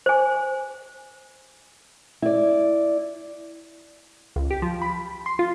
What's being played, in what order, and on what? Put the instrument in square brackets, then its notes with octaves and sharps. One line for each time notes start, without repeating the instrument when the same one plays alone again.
[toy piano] C5 G#5
[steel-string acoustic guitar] E4 D5
[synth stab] C#2
G4
F3
B5
C6
F4